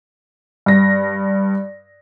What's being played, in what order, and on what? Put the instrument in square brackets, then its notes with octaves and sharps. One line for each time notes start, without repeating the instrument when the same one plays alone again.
[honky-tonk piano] G2 A#6